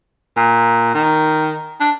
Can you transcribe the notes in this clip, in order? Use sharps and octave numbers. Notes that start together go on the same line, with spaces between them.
A#2
D#3
D4